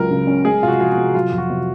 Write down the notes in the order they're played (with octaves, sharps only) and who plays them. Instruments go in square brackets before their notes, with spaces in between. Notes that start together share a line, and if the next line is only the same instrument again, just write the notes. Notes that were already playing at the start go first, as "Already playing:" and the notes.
Already playing: [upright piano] C#2 F#3 [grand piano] A#4
[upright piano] C#3
C#4
[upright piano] G#3 [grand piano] G#4
[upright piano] C3 [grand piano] F4
[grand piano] F#4
[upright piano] F3 [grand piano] F4
[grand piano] F#4
[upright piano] C3
[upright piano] F#3 [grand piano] F4
[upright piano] F2
[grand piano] F#4
[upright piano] C3